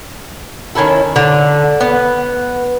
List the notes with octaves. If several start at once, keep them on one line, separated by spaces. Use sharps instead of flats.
D#3 C#4 E4 A4
D3
B3